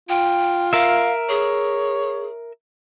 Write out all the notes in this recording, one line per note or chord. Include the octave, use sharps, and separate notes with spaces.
F4 G5
A#4 E5 F5
G#4 C#5